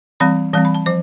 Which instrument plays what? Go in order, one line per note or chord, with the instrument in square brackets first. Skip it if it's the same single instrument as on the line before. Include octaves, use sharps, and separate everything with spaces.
[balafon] E3 G3 C4 B5
E3 G3 C4 A5
B5
A5
F3 C5